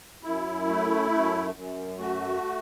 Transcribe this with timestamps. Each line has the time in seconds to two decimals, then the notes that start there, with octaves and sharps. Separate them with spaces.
0.23 F#2 E4
0.68 A3
1.12 F#2
1.55 F#2
1.99 A3 F#4